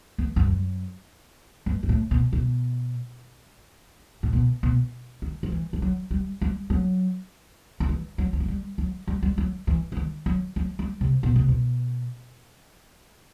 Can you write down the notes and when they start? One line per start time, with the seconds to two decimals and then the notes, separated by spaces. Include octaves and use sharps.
0.18 E2
0.36 G2
0.47 F#2
1.66 G2
1.83 G2
1.89 A2
2.11 B2
2.33 B2
4.23 A2
4.33 B2
4.63 B2
5.22 D#3
5.43 F#3
5.52 E3
5.73 G3
5.82 F#3
6.11 G3
6.41 G3
6.70 F#3
7.80 D#3
7.89 E3
8.18 F#3
8.33 E3
8.40 F#3
8.48 G3
8.78 F#3
9.07 G3
9.23 G3
9.38 F#3
9.67 E3
9.92 E3
9.96 D#3
10.26 F#3
10.56 F#3
10.79 G3
11.01 C3
11.23 B2
11.36 C3
11.48 B2